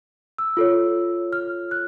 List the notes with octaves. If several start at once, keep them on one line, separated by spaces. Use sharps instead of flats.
E6
F4 A4 C#5
F6
F#6